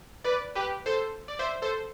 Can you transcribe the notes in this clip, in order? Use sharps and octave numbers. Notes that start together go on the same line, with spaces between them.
B4 D5
G4 B4
A4 C5
D5
C5 E5
A4 C5